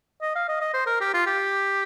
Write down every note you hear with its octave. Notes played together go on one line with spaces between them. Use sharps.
D#5
F5
D#5
D#5
C5
A#4
G4
F4
G4